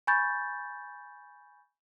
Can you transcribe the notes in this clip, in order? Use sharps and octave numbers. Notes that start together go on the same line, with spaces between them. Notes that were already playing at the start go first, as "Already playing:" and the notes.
G#5 B5 C#6 G6 A6